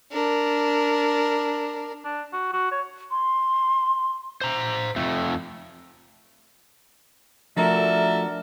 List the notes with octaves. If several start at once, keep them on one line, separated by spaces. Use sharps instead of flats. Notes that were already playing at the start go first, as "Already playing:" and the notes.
D4 A#4
D4
F#4
F#4
C#5
C6
C5 A#5
F2 A3
F3 A3 D4 F#4 A4 A#4 E5